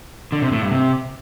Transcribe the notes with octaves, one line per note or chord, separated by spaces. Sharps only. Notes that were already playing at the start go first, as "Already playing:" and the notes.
D3
C3
A2
G2
C3